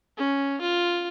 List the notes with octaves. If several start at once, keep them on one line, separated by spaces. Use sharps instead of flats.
C#4
F4